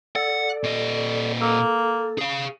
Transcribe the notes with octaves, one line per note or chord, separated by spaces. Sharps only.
A4 D5 F#5
A#2 D#5
A#3 A4
G#4 F5